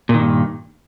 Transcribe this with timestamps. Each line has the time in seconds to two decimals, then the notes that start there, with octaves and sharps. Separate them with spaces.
0.09 A#2
0.14 D#3
0.19 G2